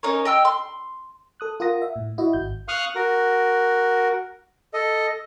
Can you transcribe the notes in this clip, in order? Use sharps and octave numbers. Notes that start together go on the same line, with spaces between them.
C#4 D#4 A#4 C#5
D#5 G5 E6 F6
C6
A4 D#6 F#6
F4 A#4 F#5 D#6 A#6
E5
A2
E4 F#4 D#5
G#1 G6
F5 C#6 D#6 F6 F#6
F#4 A#4
A4 D#5